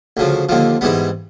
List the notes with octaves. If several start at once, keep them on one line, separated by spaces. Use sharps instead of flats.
D2 C#3 F3
D#2 D3 F3
G#2 E3 G3 B3